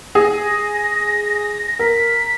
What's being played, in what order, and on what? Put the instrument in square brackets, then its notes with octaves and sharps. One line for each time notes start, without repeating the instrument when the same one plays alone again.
[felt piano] G#4 [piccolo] A#6
[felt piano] A#4 [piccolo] B6